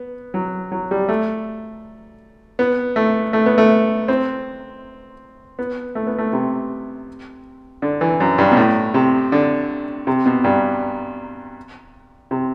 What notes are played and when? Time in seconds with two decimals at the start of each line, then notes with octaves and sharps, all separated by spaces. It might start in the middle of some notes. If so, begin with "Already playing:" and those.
Already playing: B3
0.34 F#3
0.72 F#3
0.91 G3
1.09 A3
2.59 B3
2.96 A3
3.33 A3
3.46 B3
3.58 A3
4.08 C4
5.59 B3
5.95 A3
6.07 B3
6.18 A3
6.33 C3
7.82 D3
8.01 E3
8.20 F#2
8.38 G2
8.51 B2
8.57 A2
8.94 C3
9.32 D3
10.07 C3
10.26 B2
10.44 G2
12.31 C3